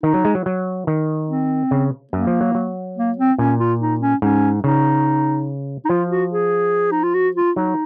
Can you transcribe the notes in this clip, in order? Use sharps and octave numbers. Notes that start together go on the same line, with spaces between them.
D#3 D#4
F#3
G#3
F#3
F#3
D#3
C4
C#3
F#2 A#3
F3
F#3
F#3
A#3
C4
A#2 C#4
F4
D#4
C#4
G#2 C#4
C#3 D#4
D#4
F3 F4
F#4
G#4
D#4
F4
F#4
F4
F#3 D#4